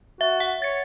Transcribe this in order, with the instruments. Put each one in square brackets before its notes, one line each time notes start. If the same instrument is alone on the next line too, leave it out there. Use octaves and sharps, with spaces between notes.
[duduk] F#4 [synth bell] E5
[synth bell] F#5
[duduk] C#5 [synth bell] A6 C#7